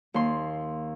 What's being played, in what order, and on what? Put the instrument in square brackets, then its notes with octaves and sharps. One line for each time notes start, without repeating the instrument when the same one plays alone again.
[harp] D#2 C6